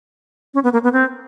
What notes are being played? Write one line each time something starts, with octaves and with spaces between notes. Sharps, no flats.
C#4
B3
A#3
B3
C4